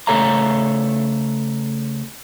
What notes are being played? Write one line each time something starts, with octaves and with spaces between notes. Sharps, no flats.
C#3 A3 A4 C#5 F5 A#5